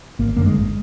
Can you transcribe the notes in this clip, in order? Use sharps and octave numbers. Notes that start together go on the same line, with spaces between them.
G#1 A#3
F#2 D3 A#3
G#3
G#1